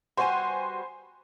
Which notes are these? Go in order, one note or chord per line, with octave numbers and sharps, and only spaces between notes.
G3 B3 F#4 C5 G#5